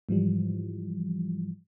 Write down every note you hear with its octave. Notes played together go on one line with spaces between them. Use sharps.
G#2 E3 F3 G3